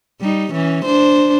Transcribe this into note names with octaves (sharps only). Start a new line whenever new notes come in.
G3 D#4
E3 C#4
D4 C5